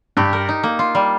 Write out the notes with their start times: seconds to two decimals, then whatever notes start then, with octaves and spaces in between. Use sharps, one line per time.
0.17 G2 G4
0.33 A#4
0.49 D#4
0.63 A#3
0.79 F4
0.95 G3